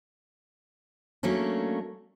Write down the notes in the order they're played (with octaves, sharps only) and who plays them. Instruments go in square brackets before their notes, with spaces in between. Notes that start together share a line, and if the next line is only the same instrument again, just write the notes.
[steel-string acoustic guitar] F#3 A3 A#3 C#4 D4